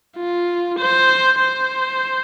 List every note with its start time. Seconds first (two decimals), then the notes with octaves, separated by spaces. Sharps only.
0.17 F4
0.78 C5
1.39 C5